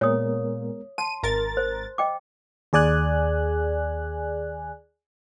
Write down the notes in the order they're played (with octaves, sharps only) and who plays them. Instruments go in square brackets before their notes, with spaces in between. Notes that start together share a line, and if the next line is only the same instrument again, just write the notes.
[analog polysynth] A#2 [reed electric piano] G#3 B3 A#4 [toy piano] C#5 D#6
[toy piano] A5 [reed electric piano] C6 [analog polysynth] D#7
[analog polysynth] G#1 A#4 A6
[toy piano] C5
D#5 G5 D6
[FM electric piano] D#2 G#4 D5 G#5 F#6